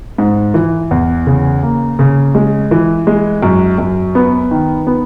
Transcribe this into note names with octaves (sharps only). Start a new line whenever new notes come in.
G#2
E3
E2
C#3
A#3
C#3
G#3
E3
G#3
F#2
F#2
B3
D#3
B3